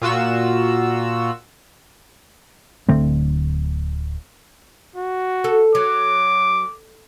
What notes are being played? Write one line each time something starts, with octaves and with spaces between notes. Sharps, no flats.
A#2 F4 F#4 E6
D1 D3 A3 C4
F#4
A4
F#3 D6